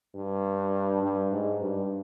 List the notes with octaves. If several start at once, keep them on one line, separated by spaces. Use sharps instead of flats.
G2
G2
G#2
G2